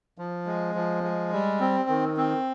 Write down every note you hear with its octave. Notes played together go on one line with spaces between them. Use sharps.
F3
G#3
F3
G#3
G3
C4
D#3
C4